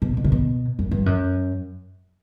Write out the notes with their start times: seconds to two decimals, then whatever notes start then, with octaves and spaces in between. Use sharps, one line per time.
0.02 B2
0.17 B2
0.24 C3
0.32 B2
0.79 F#2
0.91 G2
1.06 F#2